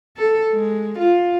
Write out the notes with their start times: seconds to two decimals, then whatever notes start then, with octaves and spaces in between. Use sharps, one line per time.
0.17 A4
0.52 G#3
0.98 F4